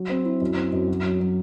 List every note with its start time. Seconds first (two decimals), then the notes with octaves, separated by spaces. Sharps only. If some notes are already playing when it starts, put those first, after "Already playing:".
Already playing: F#3
0.09 C4
0.26 E4
0.41 F#2
0.57 C4
0.73 F#2
0.88 F#3
1.04 F#3
1.20 F#3